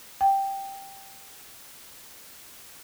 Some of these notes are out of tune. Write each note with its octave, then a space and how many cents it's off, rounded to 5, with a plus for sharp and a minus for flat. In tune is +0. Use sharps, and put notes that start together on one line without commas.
G5 +0